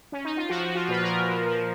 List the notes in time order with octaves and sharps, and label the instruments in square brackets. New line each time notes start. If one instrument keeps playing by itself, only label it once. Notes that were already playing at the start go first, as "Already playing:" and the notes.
[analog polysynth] C#4
D#4
F4
F3 F#4
F3 F#4
F4
A#2 B4
A#4
A#2
F3
F3